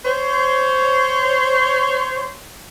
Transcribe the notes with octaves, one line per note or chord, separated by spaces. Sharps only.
C5 C#5